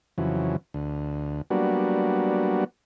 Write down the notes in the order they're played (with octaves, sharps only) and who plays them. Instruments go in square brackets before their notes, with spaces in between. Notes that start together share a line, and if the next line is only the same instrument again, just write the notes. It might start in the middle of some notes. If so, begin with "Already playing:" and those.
[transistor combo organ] F2 C#3 E3 F#3
D2
F#3 G3 A#3 B3 D4 F#4